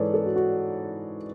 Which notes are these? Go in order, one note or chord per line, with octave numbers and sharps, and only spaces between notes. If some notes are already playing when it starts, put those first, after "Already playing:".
Already playing: G#2 E3 G#4 A4 B4 C#5 D5
A4
F#4
F#4